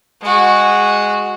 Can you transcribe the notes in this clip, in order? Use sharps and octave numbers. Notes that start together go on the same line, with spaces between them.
G#3 F#4